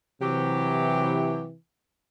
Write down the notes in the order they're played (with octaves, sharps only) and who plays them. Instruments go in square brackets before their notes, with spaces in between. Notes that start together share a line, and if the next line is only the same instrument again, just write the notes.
[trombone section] C3 E3 [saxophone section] F#3 G4